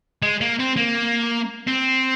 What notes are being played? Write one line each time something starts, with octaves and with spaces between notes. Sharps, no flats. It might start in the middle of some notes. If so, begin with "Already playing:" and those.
G#3
A#3
C4
A#3
C4